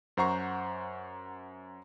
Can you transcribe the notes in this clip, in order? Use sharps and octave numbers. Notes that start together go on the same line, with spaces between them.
F#2 C5 F#5 A#5 C#6 C7